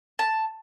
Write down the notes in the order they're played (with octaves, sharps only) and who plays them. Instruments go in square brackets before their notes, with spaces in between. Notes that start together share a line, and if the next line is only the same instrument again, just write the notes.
[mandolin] A5